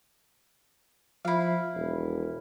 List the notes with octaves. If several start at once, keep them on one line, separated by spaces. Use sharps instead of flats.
F3 E4 F5
E1